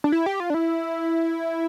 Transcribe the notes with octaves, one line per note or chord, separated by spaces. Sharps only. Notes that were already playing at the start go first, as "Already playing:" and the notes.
D4
E4
G4
F4
D4
E4